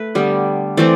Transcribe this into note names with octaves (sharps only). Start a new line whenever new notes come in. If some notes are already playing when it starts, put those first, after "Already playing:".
Already playing: A3 B4
D3 G3 B3
E3 A3 C4 D5